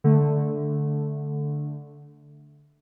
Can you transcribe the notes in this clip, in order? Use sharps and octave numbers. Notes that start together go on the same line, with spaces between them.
D3 A3